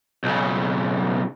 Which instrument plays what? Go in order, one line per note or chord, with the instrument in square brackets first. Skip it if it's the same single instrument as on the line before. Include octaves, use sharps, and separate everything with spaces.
[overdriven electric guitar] B1 C#3